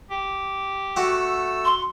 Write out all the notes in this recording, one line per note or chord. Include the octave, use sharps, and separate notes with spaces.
G4
A3 F#4 F#5 E6
C6